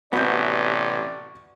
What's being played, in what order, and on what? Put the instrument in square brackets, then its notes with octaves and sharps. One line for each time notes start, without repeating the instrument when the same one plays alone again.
[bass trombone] A1 [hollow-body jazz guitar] C3 B3 [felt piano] F#4 C#6 G6 [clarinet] D5